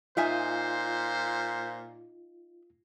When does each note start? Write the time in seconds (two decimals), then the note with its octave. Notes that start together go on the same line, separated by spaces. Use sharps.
0.17 A#2 D#4 F4 C5 E5 G#5